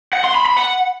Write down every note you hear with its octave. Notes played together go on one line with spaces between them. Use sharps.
F#5
C6
B5
B5
F#5